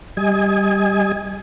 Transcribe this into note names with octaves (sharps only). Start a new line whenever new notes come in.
G3 D#5 G#5